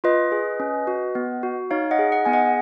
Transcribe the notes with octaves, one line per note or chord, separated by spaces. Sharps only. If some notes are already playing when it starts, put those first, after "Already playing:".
F4 B4 D#5
G#4
C#4
F#4
B3
F#4
D#4 C#5 F5
D#5 F#5
G#4
D#5 F#5
B3 G#5
D#5 F#5